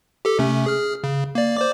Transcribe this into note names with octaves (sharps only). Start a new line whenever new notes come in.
G4 A4
C3 A3 C#4
G#4 F6
C#3
A#3 D5
C5 D5 D6